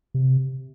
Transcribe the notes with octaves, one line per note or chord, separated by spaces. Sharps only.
C3